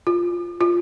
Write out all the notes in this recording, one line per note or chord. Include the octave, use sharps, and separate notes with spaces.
F4
F4